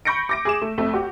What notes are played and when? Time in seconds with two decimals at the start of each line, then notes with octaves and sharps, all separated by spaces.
0.05 B5 C#6 G6 A#6 C#7 D7
0.29 D6 A#6 D7
0.45 G#4 D6 E7
0.62 A3
0.78 F2 A3
0.94 F#4 G4